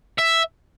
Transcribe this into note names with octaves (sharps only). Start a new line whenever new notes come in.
E5